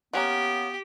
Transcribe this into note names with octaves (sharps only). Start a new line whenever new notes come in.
A#3 B3 C#4 G4 F#5